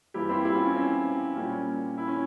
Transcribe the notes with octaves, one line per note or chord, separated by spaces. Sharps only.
G2 E3 G3 A#3 E4 G4
C4 E4
E4 G4
C#4 F4
C#4
C4
A#2 G3 A#3 C#4
E4
C#4